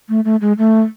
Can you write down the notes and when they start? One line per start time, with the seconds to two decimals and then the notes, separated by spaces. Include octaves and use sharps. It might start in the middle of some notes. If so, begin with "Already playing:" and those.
0.09 A3
0.25 A3
0.41 G#3
0.58 A3